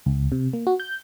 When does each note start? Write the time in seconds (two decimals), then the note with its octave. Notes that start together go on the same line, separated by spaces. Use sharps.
0.06 C#2
0.32 C3
0.53 A#3
0.67 F#4
0.80 G6